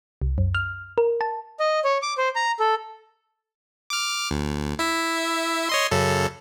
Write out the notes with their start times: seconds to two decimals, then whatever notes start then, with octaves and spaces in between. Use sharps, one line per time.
0.22 C2
0.38 F#2
0.55 F6
0.98 A#4
1.21 A5
1.60 D#5
1.84 C#5
2.02 D6
2.18 C5
2.36 A#5
2.60 A4
3.90 D6 F6
4.31 D2
4.79 E4 E5
5.69 C#5 D#5 C6
5.91 F#2 C#3 A4